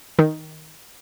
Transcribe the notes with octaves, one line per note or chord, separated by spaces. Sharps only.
D#3